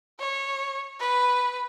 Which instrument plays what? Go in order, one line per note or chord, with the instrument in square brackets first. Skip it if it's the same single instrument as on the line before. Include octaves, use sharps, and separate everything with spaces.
[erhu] C#5
B4